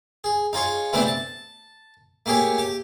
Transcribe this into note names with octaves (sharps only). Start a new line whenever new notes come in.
G#4
D#4 F4 G#4 C#5
C3 E3 A3 B3 C4 D4
A5
A3 A#3 G4 G#4 C#5
G4